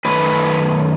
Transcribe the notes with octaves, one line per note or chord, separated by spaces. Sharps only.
F#2 D#3 A3 B4